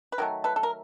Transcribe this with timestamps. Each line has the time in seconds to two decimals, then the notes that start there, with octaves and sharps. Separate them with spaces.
0.12 B4
0.18 D#3 F#3 A3 A#4
0.44 A4 B4
0.56 A4
0.63 A#4